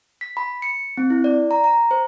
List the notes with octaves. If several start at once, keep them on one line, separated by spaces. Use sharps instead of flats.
B6
B5
C#7
C4
E4
D5
A#5
A#5
C5